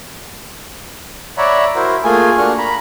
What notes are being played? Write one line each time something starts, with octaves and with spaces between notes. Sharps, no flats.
C#5 D5 E5 F#5 A#5 B5
E4 F#4 A#4 C5
A3 A#3 F4 G#4 G#5
A#3 D4 F#4 F#5 F6
A#5 B5